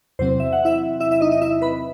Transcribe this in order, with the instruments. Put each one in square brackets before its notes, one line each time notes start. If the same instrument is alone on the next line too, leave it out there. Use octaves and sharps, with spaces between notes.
[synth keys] E2 C3 F#3 C4 C5
E5
F#5
E4 E5
E4 E5
E4 E5
D#4 D#5
D#4 D#5
E4 E5
B4 B5